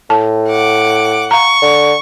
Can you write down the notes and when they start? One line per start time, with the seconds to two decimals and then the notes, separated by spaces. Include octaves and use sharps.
0.10 A2 A5
0.48 F#5 D6
1.31 F5 A#5 C#6
1.62 D3